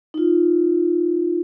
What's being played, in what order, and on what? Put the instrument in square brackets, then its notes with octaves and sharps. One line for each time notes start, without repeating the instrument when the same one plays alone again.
[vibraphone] D#4 F4